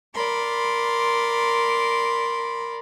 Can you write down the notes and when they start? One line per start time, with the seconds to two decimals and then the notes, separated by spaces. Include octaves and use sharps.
0.14 A#4 D5 B5 C6